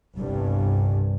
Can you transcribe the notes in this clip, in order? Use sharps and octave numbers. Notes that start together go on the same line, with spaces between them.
G1 C2 G2